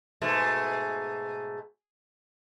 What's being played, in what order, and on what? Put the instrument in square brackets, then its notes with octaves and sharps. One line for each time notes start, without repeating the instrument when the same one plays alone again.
[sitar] G#2 B2 A3